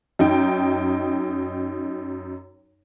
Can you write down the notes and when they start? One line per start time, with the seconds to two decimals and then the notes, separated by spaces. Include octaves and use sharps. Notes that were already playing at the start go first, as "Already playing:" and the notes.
0.19 F#2 D#4 G5